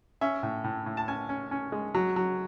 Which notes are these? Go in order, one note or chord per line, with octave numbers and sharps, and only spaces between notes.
C#4 E5
A2
A2
A2
A5
C#4 G#5
C#4
C#4
G#3
F#3
F#3